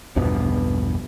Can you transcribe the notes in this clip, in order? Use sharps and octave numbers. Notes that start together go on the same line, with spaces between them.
A#1 E2 G2 B2